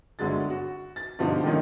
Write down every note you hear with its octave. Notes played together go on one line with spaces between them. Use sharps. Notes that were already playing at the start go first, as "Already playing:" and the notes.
G1 D3 F#3 G#3 A6
F#4
A6
G2 B2 D3 F3 D#4 G4
D#3 F3 A3 A#3 C#4 D#4